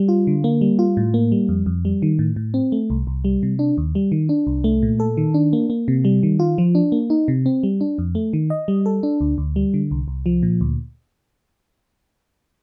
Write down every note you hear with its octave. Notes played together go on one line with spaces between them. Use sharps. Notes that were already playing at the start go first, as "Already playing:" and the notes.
Already playing: G3
F4
D3
A#3
G3
F4
A2
A#3
G3
F2
F2
G3
D#3
A2
A2
C4
A3
C2
C2
G3
C3
D4
D#2
G3
D#3
D4
C2
A3
A#2
A4
D#3
D4
A#3
A#3
C3
G3
D#3
F4
F3
D4
A#3
D#4
C3
C4
G3
D4
F2
A3
D#3
D#5
G3
A4
D4
D2
D2
G3
D3
C2
C2
F3
A#2
D2